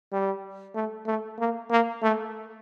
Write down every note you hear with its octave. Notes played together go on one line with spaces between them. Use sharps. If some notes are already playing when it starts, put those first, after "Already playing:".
G3
A3
A3
A#3
A#3
A3